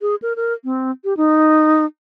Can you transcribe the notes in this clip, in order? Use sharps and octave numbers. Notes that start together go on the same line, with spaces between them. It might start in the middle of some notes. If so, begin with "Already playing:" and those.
G#4
A#4
A#4
C4
G4
D#4